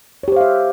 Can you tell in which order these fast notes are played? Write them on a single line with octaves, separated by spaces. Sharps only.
C#5 G4 C5 F5 E5